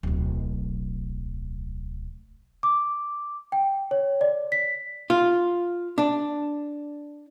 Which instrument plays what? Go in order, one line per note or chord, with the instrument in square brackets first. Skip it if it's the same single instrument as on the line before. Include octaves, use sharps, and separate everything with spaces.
[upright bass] D1 B1
[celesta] D6
G5
C#5
D5
B6
[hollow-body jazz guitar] F4
D4